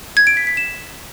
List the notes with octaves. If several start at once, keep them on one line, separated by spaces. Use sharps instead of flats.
G#6
D7
B6
B6
E7